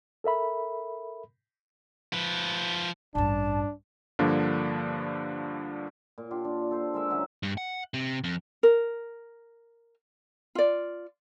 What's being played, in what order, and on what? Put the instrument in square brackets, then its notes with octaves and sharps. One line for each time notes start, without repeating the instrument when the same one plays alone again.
[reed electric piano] A4 A#4 E5 B5
[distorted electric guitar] F3 B4
[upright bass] A1 G2 [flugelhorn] D4 [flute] A5
[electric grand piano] G2 D3 F3 A#3 D4
[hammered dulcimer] A#2
D4 F4 G4
D4
A4 C5
G#3 A#4 E5
C#3 F#3 D#4 E5
[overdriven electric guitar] G2
F#5
C3
F2
[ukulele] A#4
F4 D5